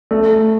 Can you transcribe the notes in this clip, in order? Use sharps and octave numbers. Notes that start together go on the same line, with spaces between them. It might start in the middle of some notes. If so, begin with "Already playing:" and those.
A3